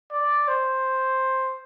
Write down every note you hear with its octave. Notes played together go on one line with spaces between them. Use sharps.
D5
C5